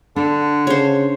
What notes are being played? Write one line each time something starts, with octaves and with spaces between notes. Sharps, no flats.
D3 D4
C#3 C5 C#5